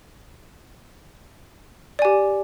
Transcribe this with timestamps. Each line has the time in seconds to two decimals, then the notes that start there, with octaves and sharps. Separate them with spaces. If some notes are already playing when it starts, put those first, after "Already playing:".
1.99 D5
2.02 G#5
2.05 G4